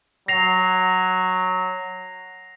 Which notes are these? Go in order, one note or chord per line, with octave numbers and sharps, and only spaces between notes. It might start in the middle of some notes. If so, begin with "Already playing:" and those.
F#3 A#6 C7 F7